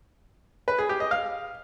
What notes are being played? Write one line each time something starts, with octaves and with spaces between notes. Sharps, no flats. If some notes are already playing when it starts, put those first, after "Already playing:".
B4
G#4
G4
D#5
F5